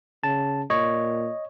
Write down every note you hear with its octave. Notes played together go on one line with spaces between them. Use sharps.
C#3 A5
A#2 C#5 D#5